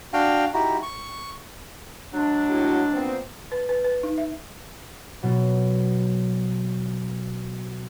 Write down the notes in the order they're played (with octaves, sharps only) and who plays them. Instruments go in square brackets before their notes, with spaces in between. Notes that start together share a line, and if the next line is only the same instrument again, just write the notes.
[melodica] D4 F#4 F5 G5
D#4 E4 F#4 G4
C#6
[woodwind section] F#3 G#3 D4
[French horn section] A2 E4 F#4
A#2 B3 C4
[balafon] B4
B4
B4
D#4
E5
[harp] B2 F#3